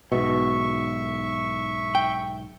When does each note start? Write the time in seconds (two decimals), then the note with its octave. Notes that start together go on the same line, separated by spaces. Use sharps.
0.12 B1 G#2 B2 E5 C#6
1.95 G5